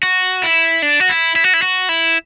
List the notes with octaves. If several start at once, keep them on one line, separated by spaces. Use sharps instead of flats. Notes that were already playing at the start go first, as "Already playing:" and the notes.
F#4
E4
D4
F#4
E4
E4
F#4
E4
F#4
E4